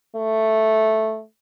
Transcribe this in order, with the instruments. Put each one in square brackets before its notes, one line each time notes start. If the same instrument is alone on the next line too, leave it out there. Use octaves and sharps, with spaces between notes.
[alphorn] A3